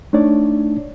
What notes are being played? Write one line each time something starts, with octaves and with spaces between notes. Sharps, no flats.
A3 D4 D#4 C#5 D5